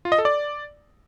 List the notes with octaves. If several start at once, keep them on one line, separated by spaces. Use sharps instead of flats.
F4
D#5
A4
D5